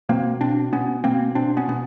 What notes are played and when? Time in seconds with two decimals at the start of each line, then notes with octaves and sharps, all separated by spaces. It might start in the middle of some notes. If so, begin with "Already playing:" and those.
0.09 B2 A#3 C4
0.41 B2 C4 D4
0.72 B2 B3 C#4
1.04 B2 A#3 C4
1.35 B2 C4 D4
1.57 B3 C#4
1.67 B2 B3